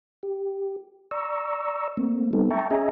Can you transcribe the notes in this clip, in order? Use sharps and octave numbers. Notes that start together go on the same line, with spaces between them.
G4
D5 A#5 C#6 E6
A3 A#3 C4
G3 B3 C4 D#4 A4
E5 G5 A5 A#5 C#6
C#4 G#4 D#5 E5 G#5 A#5